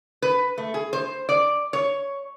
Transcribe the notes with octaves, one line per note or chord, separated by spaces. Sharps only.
B4
A3
G#4
C5
D5
C#5